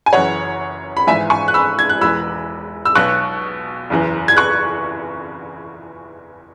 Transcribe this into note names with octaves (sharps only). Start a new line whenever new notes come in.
G#5
F#1 F#2 E3 C#5 F#5
B5
G#1 G#2 E3 E5 G#5
G#5 C#6
F#6
B5 E6
G#6
F#6
E1 E2 E3 B5 E6
E6
B1 B2 C#6 F#6
F#1 E2 E3
G#6
C#6 F#6